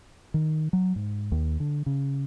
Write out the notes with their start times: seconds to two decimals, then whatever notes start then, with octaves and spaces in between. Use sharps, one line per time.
0.34 D#3
0.73 F#3
0.96 G#2
1.32 D#2
1.60 D3
1.86 C#3